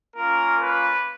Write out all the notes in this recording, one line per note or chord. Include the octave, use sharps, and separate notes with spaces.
A#3 C#4 F4 A#4
B4